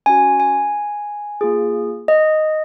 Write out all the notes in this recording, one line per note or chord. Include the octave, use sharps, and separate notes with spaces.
C#4 F#4 G#5
G#5
A#3 F4 G#4
D#5